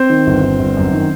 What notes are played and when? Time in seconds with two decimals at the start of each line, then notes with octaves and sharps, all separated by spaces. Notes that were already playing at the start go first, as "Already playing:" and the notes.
Already playing: C4 C5
0.10 D#3
0.27 G1
0.43 G1
0.59 G1
0.77 F#2
0.92 D#3